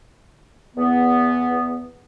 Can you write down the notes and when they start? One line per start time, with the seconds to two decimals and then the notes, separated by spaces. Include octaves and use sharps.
0.76 E2 B3